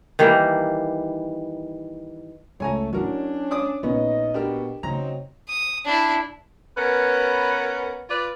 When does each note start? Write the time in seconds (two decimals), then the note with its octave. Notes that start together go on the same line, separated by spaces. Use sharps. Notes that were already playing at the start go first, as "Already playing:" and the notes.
0.19 D#3 E3 G3 A#3
2.60 C#2 A3 C#5 G#5 A#5
2.93 F#3 C#4 D4 E4 F#4 A#4
3.51 D5 D6 D#6
3.83 A#1 B3 C#4 D#4 D#5
4.34 B2 D4 G4 A#4
4.83 C#3 F#3 C4 D#4 A#5
5.49 D#6
5.85 D4 E4
6.77 B3 C#4 A#4 B4
8.09 F4 B4 D5